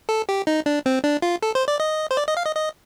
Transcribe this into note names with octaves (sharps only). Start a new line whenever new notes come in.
A4
G4
D#4
D4
C4
D4
F4
A4
C5
D5
D#5
C5
D5
D#5
F5
D#5
D#5